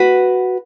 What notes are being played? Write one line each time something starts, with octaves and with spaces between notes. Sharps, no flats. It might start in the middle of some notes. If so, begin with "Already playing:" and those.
Already playing: F#4 B4